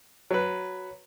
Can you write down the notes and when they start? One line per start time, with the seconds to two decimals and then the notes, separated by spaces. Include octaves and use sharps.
0.31 F#3 B4